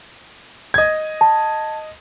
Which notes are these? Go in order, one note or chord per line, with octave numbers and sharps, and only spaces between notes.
D#5 G#6
A5